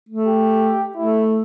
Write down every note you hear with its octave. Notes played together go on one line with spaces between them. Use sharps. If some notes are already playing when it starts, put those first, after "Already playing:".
A3
G4
A3 E4